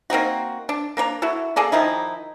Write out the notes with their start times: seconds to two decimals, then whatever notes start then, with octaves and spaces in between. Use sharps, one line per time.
0.10 A#3 C4 D#4 F#4
0.69 D4
0.97 A#3 D4 C#5 A#5
1.22 E4 F#4 A4
1.56 A#3 G#4 A4 D5
1.72 D#3 F3 D#4 E4